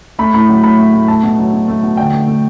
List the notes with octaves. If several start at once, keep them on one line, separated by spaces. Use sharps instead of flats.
A3 B5
A2 B5
F#3
A2 B5
A3
A2
A3 A5
B2
F#3
B2
A3
B2
D3 G5
A3
A3